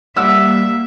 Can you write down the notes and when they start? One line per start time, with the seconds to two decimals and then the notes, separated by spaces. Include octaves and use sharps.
0.16 G3 A#3 G4 E5 F#5 E6